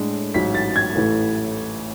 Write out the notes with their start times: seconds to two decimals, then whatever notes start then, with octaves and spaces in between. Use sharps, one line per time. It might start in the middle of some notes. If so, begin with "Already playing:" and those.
Already playing: A2 G#3 D4
0.34 A1 G#2 F#3 B6
0.55 A6
0.76 G#6
0.95 A1 A2 E3 A3 E4